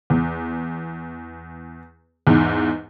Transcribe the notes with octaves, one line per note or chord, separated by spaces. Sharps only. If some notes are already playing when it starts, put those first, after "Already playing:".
E2
E2 G#2